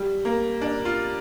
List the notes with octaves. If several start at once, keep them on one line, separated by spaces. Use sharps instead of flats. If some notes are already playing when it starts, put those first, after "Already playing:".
Already playing: G3
A#3
D4
F4